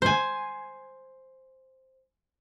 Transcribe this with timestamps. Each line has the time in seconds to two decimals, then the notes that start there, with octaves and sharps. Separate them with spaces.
0.02 C5 G#5